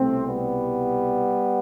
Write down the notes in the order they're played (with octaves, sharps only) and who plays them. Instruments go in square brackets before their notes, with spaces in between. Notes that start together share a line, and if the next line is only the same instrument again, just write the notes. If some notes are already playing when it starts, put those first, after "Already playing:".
Already playing: [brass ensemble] C2 B2 A3 C4
G3 B3